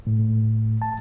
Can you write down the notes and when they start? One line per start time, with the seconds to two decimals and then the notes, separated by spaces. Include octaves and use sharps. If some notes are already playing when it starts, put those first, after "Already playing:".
0.07 A2
0.82 A5